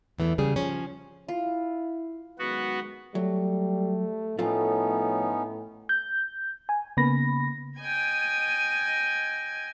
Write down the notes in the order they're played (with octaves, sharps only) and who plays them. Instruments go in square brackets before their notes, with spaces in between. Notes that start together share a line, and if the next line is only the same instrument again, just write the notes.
[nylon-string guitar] E2 E3 A3
C#3 G3 G#4
F3 C#4
[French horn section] E4 [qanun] F4
[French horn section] F#2 D#3 G#3 [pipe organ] B3 F#4
[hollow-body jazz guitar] F#3 [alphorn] G3 [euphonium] A3
[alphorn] A2 [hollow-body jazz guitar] F3 A3 F4 [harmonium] B3 C#4 D#4 [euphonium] A4
[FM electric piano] G6
G#5
C#3 A#3 B3 B5 A#6
[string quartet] D#5 G5 G#5 G#6